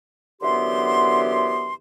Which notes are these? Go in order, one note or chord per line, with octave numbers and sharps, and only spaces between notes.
F#2 D3 E3 B3 G4 C6